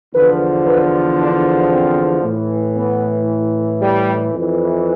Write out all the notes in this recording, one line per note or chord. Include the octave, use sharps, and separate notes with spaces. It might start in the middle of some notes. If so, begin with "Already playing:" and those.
E2 D3 F3 B4
B4
D4
C4
A2 E3
B3
G3
F2 E3